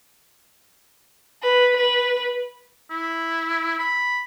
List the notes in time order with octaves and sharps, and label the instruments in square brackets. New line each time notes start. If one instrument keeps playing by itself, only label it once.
[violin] B4
B4
[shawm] E4
B5